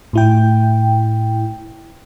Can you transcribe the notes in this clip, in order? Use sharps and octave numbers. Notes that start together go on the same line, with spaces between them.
A2 E4 G5